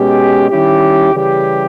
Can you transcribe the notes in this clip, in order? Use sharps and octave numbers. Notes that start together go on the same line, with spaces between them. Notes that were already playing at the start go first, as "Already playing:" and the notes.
Already playing: B2 G#3 C#4 G4
D#3 G3 C#4 E4 G4
C#3 E3 G3 C#4 G4